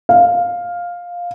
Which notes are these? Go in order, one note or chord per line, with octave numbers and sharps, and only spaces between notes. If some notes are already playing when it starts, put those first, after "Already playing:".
F5